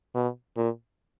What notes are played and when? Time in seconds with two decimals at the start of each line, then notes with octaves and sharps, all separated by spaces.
0.15 B2
0.57 A#2